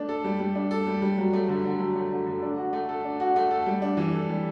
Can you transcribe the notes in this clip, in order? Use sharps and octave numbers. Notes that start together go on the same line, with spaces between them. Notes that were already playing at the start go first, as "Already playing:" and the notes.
Already playing: A3 D4
A4
G3
G3
D4
A4
G3
G3
F#3
A3
D3
D3
F#3
A3
D3
D3
D4
F#4
A3
A4
D4
F#4
A3
A4
G3
D4
E3
A4
G3